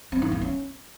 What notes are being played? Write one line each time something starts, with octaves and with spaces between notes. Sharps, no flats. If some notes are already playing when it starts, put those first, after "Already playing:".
C4
D#4
A#3
C#4